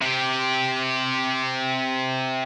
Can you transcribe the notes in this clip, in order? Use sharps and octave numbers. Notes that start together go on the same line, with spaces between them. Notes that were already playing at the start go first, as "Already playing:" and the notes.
C3 G4